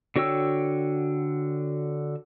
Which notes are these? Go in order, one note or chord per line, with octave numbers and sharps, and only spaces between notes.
D3 F#4 C#5 G5 E6